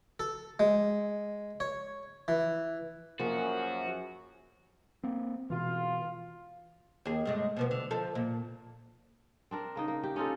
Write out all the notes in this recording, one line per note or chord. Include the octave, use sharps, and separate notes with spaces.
A4
G#3
C#5
E3
F#2 F3 A#3 F#4 G#4
A#3 C4
B2 E3 F4
D#2 G#4
G2 G#3 A3
B2 F3 B3
D3
F3 A4
A#2
C4 D4 A#4
C#3 A#3 D#4
A#3
G4
C#4 D#4 F4 A4